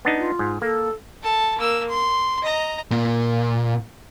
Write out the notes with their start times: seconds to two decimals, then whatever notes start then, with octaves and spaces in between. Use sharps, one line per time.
0.05 B3 D4 D#4
0.18 F4
0.39 G#2
0.62 A#3 A4
1.23 A4 A5
1.59 A#3 E6
1.89 C6
2.43 D#5 A#5
2.91 A#2